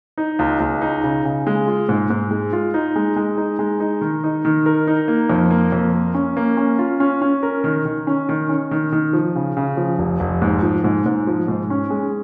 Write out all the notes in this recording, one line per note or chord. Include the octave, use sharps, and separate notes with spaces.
D#4
C#2
C#2
D#4
C#3
C#3
G#3
F4
G#2
G#2
G#3
F4
D#4
G#3
G#3
D#4
G#3
D#4
D#3
D#4
D#3
A#4
D#4
A#3
F2
A#3
F2
A#3
C#4
A#3
C#4
F4
C#4
C#4
A#4
D#3
D#3
C#4
D#3
C#4
D#3
D#3
F3
C#3
C#3
F3
F1
F1
G#2
F3
G#2
G#2
F3
G#2
C#4
G#3